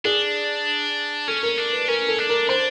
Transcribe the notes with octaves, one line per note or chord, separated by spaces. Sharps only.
D4 G#4
C#4 A4
A#4
D4
B4
C#4 A#4
A4
D4
A#4
D4 C5